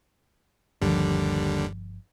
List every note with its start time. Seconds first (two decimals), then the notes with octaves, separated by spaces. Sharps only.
0.82 G1 D#2 D3 F3 G3